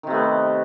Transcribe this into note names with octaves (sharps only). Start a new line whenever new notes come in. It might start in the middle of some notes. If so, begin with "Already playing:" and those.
C3 D#3 A3 B3